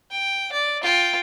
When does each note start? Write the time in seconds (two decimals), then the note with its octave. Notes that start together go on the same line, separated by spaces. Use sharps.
0.11 G5
0.52 D5
0.83 F4 G5